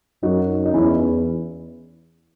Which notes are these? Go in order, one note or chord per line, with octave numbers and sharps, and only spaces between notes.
F#2 D#4 F#4
D#4
E2 C#4 E4